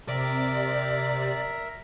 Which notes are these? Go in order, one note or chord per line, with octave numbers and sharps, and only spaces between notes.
C3 A#4 D5 E5 A#5